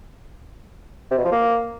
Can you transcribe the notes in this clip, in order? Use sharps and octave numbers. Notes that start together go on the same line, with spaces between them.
C3
B2
F3
A#3